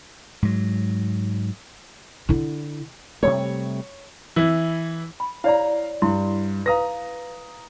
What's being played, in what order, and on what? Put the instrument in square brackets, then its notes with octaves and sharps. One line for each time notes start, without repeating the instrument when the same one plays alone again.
[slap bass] G#2 F#3
[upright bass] D3 E4
[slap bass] C3 G3 A3 [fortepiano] C#5
[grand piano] E3 E4
[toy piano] B5
[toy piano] E4 C#5 D5 [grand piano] F5 A#5
[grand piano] G2 [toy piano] E4 C6
[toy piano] B4 F5 [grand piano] A#5 D#6 A#6